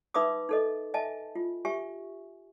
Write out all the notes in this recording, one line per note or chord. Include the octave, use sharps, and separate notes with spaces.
D#4 B4 E5 B5 D6 D#6
D#4 A4 D#5
D#5 E5 G#5 A5
F4
G4 E5 G#5 C#6